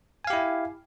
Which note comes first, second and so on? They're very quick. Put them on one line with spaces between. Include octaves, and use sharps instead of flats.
G#5 F5 G4 E4